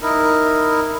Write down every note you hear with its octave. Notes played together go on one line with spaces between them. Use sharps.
D#4 E4 A#4